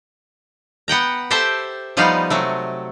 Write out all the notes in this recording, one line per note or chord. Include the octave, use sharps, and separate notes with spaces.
B3 F#5 G5 A#5
G4 A4 C5 E5 G5 A5
F3 G3 B3 D#4 D5 F5
C3 F#3 A3